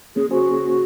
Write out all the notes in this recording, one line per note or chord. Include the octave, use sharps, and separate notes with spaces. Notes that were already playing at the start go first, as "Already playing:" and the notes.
A#3 C#4 G#4
F#4 G#4 C5